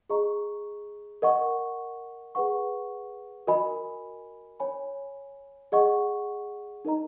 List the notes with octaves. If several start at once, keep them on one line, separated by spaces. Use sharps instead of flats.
G#4 D#5 A#5 C#6
A#4 D#5 F#5 C#6
G#4 B4 F#5 C#6
F#4 A#4 D#5 G#5 B5
C#5 G#5 B5
G#4 D#5 F#5 C#6
D#4 A#4 D#5 A#5